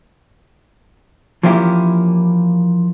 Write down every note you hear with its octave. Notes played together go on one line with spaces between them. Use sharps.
E3 F3 A#3 C#4 E4 G4